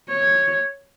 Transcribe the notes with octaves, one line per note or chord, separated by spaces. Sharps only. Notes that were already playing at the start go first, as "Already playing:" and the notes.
C#5